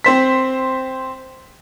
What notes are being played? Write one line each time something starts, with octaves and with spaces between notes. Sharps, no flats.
C4 C5 B6